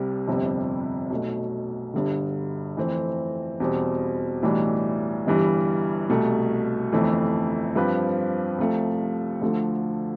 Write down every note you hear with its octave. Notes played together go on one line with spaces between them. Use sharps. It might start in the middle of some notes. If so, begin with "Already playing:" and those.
Already playing: C2 C3 G3
G1 F2 C3 G3
B1 B2 A3
G1 G2 D3
F2 E3 A3 C4
E2 B2 G3 C4
B1 A2 E3 G3 D4
G1 G2 E3 G3
C2 B2 A3
G1 F2 E3 A3
G2 F3 C4 G4 B4
C2 C3 F3 A3
D2 D3 F3 A3